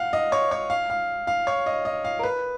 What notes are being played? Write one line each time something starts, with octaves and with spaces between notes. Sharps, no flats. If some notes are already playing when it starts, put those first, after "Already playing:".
Already playing: F5 F#5
D#5
C#5
C#5
F5
F5
F5
C#5
D#5
D#5
F5
A#4
B4